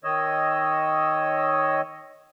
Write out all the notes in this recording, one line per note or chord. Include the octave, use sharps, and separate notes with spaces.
D#3 C#5 D#5 E6